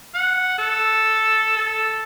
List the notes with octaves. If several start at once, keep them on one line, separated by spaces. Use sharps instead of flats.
F#5
A4
A4